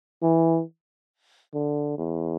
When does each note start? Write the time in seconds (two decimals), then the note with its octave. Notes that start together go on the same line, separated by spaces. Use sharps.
0.22 E3
1.54 D3
1.98 E2